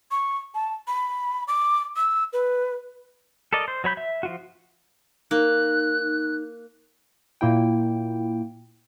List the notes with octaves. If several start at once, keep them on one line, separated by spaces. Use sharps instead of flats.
C#6
A5
B5
D6
E6
B4
A4 A#4 D5 D#5
C5
F#3 C#5 B5 G6
E5
F3 F4 F#4
A#3 D#4 F#6
A#2 A#3 E4 G5